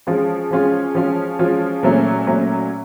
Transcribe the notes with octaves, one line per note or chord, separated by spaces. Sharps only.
F3 G#3 C#4 F4
F3 G#3 C#4 F4
F3 G#3 C#4 F4
F3 G#3 C#4 F4
A#2 F#3 A3 C#4
A#2 F#3 A3 C#4